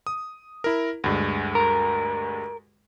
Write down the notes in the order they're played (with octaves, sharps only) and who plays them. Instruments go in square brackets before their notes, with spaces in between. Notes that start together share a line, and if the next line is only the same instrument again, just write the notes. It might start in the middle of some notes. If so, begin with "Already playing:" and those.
[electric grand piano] D#6
E4 A#4
D2 G2 G#3
[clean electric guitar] A#4